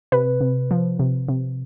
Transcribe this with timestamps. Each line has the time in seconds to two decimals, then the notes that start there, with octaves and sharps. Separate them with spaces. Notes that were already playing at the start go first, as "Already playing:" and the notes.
0.12 C3 B4
0.41 C3
0.71 F3
0.99 C3
1.29 C3